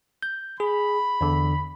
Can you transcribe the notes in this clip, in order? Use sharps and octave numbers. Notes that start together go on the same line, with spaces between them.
G6
G#4 B5
E2 D3